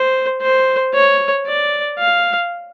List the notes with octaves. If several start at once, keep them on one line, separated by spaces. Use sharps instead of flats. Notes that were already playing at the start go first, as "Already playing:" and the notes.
Already playing: C5
C5
C#5
D5
F5